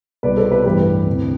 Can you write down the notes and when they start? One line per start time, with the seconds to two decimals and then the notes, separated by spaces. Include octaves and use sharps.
0.23 C2 B2 B4 D5
0.37 A4 C5
0.51 G4 B4
0.65 A1 G2 E3 G4 B4
1.06 D2 C3 E3